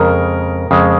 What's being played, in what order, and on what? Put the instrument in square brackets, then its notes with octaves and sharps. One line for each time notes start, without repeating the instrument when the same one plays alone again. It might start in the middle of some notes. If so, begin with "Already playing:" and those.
Already playing: [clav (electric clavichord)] F2 C#3 G#3 [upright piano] A#4
[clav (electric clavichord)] F2 C#3 G#3